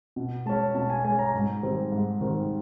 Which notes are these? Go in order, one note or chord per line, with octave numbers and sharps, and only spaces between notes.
B2
G#3 C#4 A5
B2 A5
G#5
G#3 C#4 G#5
A#5
G#2
D#3 G3 C4
G#2
D#3 G3 C4